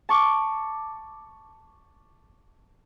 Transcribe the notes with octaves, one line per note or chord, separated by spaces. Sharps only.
A5 C#6 D6